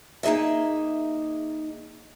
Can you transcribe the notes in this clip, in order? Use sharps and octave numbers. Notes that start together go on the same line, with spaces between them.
A#3 D#4 G#4 D#5 E5